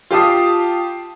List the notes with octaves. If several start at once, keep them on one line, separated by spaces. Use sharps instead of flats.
F4 G4 A5 D#6 C7